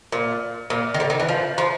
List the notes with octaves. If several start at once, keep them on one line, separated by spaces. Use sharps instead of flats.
A#2
A#2
D#3
D3
D#3
E3
F3
F3